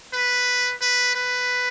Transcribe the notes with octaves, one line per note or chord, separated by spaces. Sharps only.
B4
B4
B4